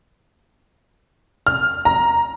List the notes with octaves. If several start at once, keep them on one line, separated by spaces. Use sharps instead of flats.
F6
A#5